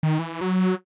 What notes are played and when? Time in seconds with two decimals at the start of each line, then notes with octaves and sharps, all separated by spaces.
0.03 D#3
0.19 E3
0.41 F#3